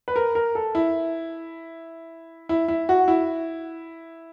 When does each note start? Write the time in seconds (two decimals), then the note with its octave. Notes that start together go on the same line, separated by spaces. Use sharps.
0.08 B4
0.16 A#4
0.35 A#4
0.55 A4
0.75 E4
2.49 E4
2.68 E4
2.89 F#4
3.08 E4